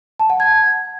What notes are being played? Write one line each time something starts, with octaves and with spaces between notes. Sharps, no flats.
A5
F#5
G#6